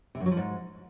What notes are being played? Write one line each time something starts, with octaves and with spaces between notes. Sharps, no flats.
C3
F#2
F#3
F3
G#2